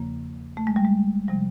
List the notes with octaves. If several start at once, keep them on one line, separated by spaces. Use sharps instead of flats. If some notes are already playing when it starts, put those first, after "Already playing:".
Already playing: E2 C#3 F3 A#3
A3
G#3
G3
G#3
C3 F3 G3